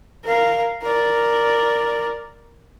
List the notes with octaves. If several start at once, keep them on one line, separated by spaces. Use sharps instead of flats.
A#4 F5
A#4 D5